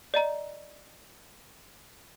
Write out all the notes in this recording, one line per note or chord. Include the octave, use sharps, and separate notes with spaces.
D5 D#5 A#5